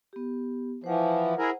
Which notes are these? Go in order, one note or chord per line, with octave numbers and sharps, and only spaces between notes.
B3 G4
E3 F3 C5 F#5
E4 G#4 A#4